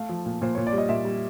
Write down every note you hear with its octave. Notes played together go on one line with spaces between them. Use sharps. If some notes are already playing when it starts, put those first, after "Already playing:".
Already playing: A3 F5
F3
A#2
A#2 C5
A#2 C#5
D5
G3
D#5
A#2 E5
G3